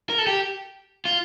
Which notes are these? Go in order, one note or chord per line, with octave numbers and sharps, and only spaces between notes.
A#4
A4
G4
F4